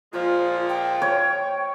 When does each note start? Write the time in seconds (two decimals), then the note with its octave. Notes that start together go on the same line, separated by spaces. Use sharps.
0.13 A#2 F3 G#3 F4
0.69 G5
1.02 C#5